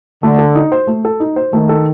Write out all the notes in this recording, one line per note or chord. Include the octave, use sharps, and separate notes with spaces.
D3 A3
A4
D#4
C5
A3
A4
D#4
C5
D#3 A3
A4